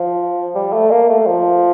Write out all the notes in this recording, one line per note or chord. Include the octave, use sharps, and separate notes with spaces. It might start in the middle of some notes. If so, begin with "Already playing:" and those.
Already playing: F3
G3
A3
A#3
A3
F3